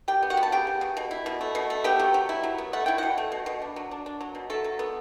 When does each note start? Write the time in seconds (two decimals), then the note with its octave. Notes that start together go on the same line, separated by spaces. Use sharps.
0.08 G3 G4 G5
0.23 B3
0.30 F#4 F#5
0.37 B3
0.43 A5
0.52 C#3 G4 G5
0.67 B3
0.81 C#3
0.97 B2
1.11 E4
1.26 B2
1.41 A3
1.55 B2
1.70 A3
1.84 B3 G4 G5
1.99 F#3
2.14 F#3
2.29 E4
2.43 F#3
2.58 B3
2.73 A3 F#5
2.86 E4 G5
2.98 B2 F#4 F#5
3.18 A3
3.32 B2
3.46 B2
3.62 D4
3.76 F#3
3.91 D4
4.06 D4
4.21 F#3
4.35 B2
4.50 F#3 A3 A4
4.64 F#3
4.79 B3